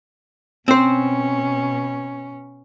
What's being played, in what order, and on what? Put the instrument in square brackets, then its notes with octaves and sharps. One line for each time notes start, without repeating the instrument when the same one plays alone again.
[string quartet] B2 C#4 [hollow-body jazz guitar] C4 C5